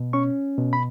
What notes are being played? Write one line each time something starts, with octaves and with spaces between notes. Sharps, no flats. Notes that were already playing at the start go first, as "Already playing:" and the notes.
Already playing: B2
C#4 C#6
B2
B5